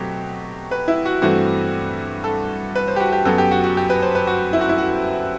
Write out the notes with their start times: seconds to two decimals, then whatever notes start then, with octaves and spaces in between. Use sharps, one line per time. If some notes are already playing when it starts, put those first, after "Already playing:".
Already playing: B2 F#3 A3 C4 G4
0.71 B4
0.88 E4
1.05 F#4
1.22 G2 E3 A3 C4 F#4
2.24 A4
2.75 B4
2.88 C5
2.96 G4
3.00 F#4
3.12 G4
3.25 F#2 F#3 B3 A4
3.38 G4
3.51 F#4
3.64 F#4
3.77 G4
3.90 B4
4.02 C5
4.15 B4
4.27 F#4
4.53 E4
4.61 F#4
4.69 E4
4.78 F#4